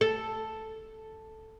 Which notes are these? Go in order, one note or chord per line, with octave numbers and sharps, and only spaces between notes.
A4